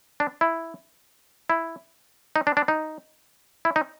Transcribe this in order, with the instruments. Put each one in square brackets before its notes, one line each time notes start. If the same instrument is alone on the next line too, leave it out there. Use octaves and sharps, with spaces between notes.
[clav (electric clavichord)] D4
E4
E4
D#4
D4
D4
D#4
E4
D#4